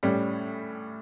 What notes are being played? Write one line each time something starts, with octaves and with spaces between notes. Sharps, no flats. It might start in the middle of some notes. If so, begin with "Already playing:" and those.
A2 G3 C#4